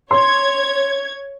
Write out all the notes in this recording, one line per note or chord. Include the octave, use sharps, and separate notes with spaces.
C#5 C6 G#6